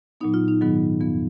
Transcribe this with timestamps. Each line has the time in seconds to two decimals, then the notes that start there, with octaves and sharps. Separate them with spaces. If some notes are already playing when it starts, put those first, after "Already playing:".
0.21 A#2 F#3 B3 D#4
0.34 F4
0.48 D#4
0.61 G#2 D#3 F#3 B3
1.00 F2 F3 B3